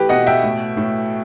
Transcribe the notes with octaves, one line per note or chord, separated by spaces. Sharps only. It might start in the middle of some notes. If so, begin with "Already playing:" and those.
Already playing: E3 A3 G4 B4
B2 D#5 F#5
E5 G5
A2
A2